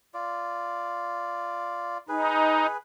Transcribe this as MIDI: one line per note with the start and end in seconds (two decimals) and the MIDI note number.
0.14 1.98 65
0.14 1.98 74
2.09 2.66 63
2.09 2.77 68
2.09 2.77 71